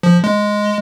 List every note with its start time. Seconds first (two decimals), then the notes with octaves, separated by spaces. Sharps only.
0.03 F3
0.24 G#3